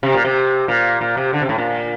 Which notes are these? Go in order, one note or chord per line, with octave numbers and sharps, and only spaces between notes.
C3
A#2
C3
A#2
A#2
C3
D3
C3
A2
A#2